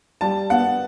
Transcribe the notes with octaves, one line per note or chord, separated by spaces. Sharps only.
G3 A5
B3 F#5